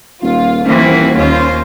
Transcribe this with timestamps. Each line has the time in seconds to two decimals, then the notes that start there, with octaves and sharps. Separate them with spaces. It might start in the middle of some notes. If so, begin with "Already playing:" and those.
0.23 D#1 F4
0.65 D#1 E3 A#3 C4 F#4
1.16 D#2 C#4 F4 C5